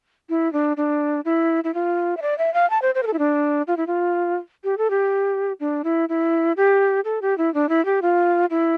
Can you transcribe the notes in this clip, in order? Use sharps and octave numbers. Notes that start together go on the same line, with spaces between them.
E4
D4
D4
E4
E4
F4
E5
D5
E5
F5
A5
C5
C5
A#4
A4
E4
D4
F4
E4
F4
G4
A4
G4
D4
E4
E4
G4
A4
G4
E4
D4
E4
G4
F4
E4